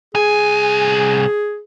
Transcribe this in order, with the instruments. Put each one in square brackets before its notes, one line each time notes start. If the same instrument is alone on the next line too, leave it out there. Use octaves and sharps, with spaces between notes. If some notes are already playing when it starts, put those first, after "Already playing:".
[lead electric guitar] C2 G#5 [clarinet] G#4